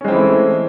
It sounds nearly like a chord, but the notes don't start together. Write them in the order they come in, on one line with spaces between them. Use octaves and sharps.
C#4 G#3 C4 E3 A3